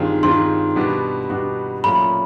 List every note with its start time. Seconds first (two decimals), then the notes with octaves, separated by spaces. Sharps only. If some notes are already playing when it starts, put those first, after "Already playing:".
Already playing: G2 D#3 G#3 C4 F4
0.23 G2 D#3 G#3 C4 F4 C6
0.76 B2 G3 B3 D4 F#4
1.30 B2 G3 B3 D4 F#4
1.84 A#2 F#3 A3 C#4 F4 B5